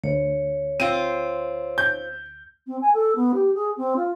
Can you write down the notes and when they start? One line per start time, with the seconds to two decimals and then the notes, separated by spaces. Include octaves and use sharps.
0.04 D2 C#5
0.80 C4 F4 D#7
1.78 G6
2.67 C4
2.81 G#5
2.94 A4
3.15 B3
3.34 G4
3.54 G#4
3.77 C4
3.96 F4